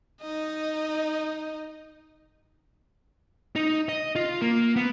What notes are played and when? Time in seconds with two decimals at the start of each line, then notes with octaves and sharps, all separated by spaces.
0.22 D#4 D#5
3.56 D#4
3.89 D#5
4.16 F4
4.42 A#3
4.76 B3